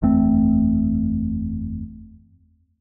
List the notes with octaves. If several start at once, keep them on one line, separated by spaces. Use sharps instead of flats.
F#1 E2 A3 C4